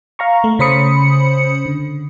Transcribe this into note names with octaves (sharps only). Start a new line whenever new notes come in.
F5 A#5 C#6
A3
C#3 C#4 C5 B5 D#6 C#7
D3